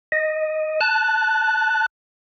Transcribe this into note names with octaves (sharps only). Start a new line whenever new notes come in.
D#5
A5 F#6